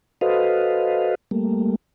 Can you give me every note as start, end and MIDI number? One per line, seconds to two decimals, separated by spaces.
0.21 1.15 66
0.21 1.15 69
0.21 1.15 71
0.21 1.15 72
0.21 1.15 75
0.21 1.15 77
1.31 1.76 55
1.31 1.76 57
1.31 1.76 58